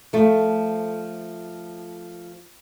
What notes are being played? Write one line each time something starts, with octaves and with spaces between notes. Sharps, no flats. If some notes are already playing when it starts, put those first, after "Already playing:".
F3 A3